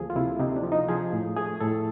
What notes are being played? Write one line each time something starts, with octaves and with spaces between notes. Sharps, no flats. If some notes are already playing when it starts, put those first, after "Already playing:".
Already playing: D2 F3 A#3 G#4 A4
F4
C3 E4
C3 D#4
D4
F3
D#4
F3 G#4
A2
A3 G#4
A2 A4